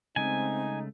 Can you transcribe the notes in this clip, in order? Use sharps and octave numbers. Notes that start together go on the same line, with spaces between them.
C#3 G#3 A3 C4 D#4 G#5